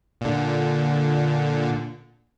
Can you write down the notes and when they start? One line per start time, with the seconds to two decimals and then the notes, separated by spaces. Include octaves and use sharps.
0.21 A#2 D3